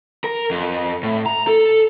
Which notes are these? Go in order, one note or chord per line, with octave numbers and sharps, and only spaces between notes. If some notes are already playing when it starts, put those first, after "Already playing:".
A#4
F2
A2
A#5
A4